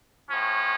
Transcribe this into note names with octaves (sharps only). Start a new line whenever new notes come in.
A2 F3 C#4